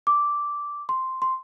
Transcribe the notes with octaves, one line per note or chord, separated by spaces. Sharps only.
D6
C6
C6